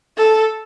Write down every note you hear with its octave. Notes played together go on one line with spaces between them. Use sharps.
A4